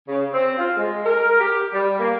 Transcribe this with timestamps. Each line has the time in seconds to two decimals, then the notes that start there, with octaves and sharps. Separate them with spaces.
0.08 C#3
0.34 C4
0.58 F4
0.76 G#3
1.05 A#4
1.39 G4
1.73 G3
1.99 A#3